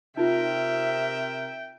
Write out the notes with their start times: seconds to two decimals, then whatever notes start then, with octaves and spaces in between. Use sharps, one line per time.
0.17 C3 D#4 F4 A#4 E5 G5